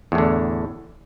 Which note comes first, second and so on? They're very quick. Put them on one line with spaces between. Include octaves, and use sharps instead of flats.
E2 A2 D3